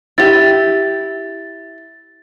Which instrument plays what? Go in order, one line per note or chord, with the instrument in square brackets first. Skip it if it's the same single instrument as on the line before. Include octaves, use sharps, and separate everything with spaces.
[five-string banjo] E4 G4 [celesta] A6